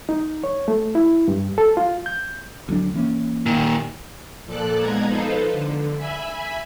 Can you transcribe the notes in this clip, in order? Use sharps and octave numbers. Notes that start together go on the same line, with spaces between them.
D#4
C#5
A3
E4
G2
A4
F4
G6
D2 F#3 D4
E3 A#3 C#4
A#2 D#3
A#2 F3 A4 D5 F#6
F3 G#3 B3 D#4 A#5 G#6
F3 D#4 F4 A4 B4 C5
D3
E5 G#5 B5